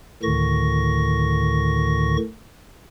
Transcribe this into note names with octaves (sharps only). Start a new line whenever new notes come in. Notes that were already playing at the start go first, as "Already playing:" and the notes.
D2 A2 D3 D#3 C#6 A#6